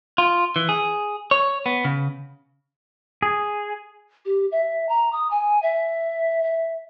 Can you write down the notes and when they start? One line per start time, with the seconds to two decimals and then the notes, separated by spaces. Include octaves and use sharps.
0.18 F4
0.56 E3
0.69 G#4
1.31 C#5
1.66 B3
1.85 C#3
3.22 G#4
4.25 G4
4.52 E5
4.89 A#5
5.13 D#6
5.31 G#5
5.63 E5
6.44 E5